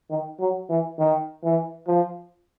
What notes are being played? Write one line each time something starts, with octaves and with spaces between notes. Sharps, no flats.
D#3
F#3
E3
D#3
E3
F3